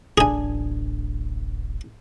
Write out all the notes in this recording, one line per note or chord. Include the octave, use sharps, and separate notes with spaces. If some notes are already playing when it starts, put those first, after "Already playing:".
D1 A1 D4 G#4 G#5